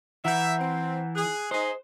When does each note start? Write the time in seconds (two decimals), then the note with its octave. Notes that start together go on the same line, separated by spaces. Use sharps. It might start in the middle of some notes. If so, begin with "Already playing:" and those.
0.25 E3 E5 F#5 A#5 G6
0.59 C4
1.15 G#4 F#6
1.51 D#4 G#4 C5